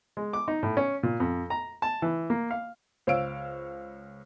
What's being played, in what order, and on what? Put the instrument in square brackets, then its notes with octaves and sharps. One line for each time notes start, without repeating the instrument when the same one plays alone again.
[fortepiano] G#3
D6
D#4
A2
C#4
A#2
F2
A#5
A5
E3
A#3
F5
[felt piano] C#2 C5 C#5 F5 E6 D7